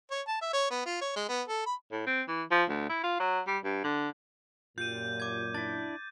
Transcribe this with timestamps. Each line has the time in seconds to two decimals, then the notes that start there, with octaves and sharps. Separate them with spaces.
0.11 C#5
0.27 A5
0.41 E5
0.53 C#5
0.70 B3
0.86 F4
1.01 C#5
1.16 G#3
1.28 B3
1.48 A4
1.66 B5
1.92 A2
2.07 C4
2.28 E3
2.51 F3
2.70 D2
2.90 E4
3.04 F4
3.20 F#3
3.47 G3
3.64 G2
3.84 D3
4.78 F#2 A#2 F4 G4 G6 D#7
5.20 D6 G#6
5.54 D4 E4 A6